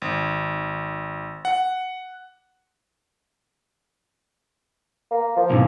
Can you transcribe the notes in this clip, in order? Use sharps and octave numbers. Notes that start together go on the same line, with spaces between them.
G#1
F#5
A#3
F3
B1 G#2